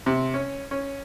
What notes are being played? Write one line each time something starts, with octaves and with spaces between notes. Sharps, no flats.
C3
C#4
C#4